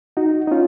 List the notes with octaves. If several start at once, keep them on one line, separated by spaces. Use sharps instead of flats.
D#4 F#4
D#4
C#4 F4